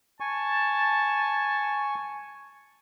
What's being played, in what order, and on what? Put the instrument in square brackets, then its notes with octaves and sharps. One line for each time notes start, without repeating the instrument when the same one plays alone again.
[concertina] G#5 C#6 [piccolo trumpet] A5